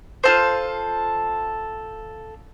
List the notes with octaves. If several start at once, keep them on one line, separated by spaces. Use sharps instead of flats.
F4 A4 C5